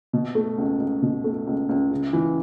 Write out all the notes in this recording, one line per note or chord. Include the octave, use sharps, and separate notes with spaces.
B2
A3
C#2
C#2
B2
A3
C#2
C#2
C#3
E3